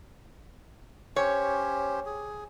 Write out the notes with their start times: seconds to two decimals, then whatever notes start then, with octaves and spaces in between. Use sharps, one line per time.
1.16 C#4 G4 C5 C#5
2.06 G#4